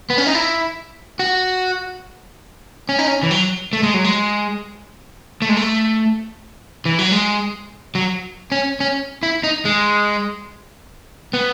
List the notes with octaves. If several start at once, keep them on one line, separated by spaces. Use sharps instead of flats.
B3
C#4
D#4
E4
F#4
C#4
D#4
C#4
E3
F#3
A3
G#3
F#3
G#3
A3
G#3
A3
E3
F#3
G#3
F#3
C#4
C#4
E4
D#4
G#3
B3